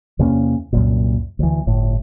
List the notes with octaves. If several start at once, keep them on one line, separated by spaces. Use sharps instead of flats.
E2 C3 A#3 C#4
C2 F#2 A#2
D2 E3
G1 A2